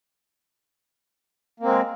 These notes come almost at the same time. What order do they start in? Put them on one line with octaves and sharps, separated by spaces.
A#3 C4 G#3